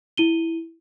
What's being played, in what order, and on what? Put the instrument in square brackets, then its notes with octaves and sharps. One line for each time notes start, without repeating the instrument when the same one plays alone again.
[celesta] E4 D#7 G7